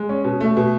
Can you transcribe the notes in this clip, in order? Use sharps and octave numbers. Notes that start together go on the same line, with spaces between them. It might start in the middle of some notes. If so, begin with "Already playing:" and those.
Already playing: G#3
C#4
B2
A3
B2